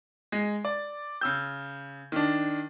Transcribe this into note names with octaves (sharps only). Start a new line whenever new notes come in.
G#3
D5
C#3 E6 G6
D#3 D4